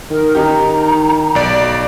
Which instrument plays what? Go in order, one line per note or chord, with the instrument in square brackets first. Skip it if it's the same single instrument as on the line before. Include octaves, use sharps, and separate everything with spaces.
[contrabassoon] D#3 [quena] A#4
[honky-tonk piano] D#4 G4 [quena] A#5
[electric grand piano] B1 D5